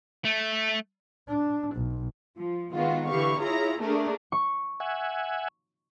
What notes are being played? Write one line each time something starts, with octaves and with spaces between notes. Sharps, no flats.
A3
D4
B1
F3
D#3 G#3 B3 F4 F#4
D3 E3 G4 F5 C#6
E4 F4 G#4 C#5 A#5
A3 A#3 D4 G#4 A#4
C#6
E5 F#5 G#5